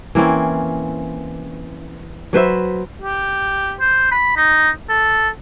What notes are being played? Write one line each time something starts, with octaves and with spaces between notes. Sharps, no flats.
E3 A#3 C4 C#4
F#3 B4 C5 E5
G4
C5
B5
D#4
A4